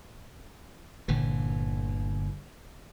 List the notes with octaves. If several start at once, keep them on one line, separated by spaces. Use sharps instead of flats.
G1 A#2 D3 E3